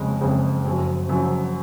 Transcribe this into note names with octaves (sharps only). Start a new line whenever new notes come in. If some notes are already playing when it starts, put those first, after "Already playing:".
Already playing: F#1 F2 C#3 G#3
F#1 F2 C#3 G#3
F#1 F#2 F3
F#1 F#2 F3